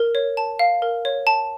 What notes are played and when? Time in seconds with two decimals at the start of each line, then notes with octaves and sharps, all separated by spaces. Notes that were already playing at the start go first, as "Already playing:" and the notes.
Already playing: A#4
0.15 C#5
0.37 A5
0.59 F5
0.82 A#4
1.05 C#5
1.27 A5